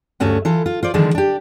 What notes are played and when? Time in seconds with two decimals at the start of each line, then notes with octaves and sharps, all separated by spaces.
0.20 D2 G2 A3 C#4 F#4
0.45 E3 F4 A4
0.66 F4
0.83 F4 C5 D5
0.94 D3 D#3 F3 G#3 B3
1.15 D4 G4